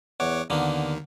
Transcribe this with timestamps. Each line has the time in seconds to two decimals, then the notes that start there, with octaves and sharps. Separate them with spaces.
0.20 E2 C#5 F#5 D6
0.50 D#2 D3 D#3 A#3 B3